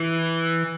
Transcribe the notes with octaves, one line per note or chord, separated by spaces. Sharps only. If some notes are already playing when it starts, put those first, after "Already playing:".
Already playing: E3